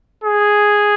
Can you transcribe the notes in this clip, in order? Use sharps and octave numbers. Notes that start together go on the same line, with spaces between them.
G#4